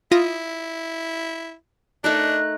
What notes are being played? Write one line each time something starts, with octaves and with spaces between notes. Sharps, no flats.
E4 F4 D#6 A#6
A3 D4 D#4 A#4 F#6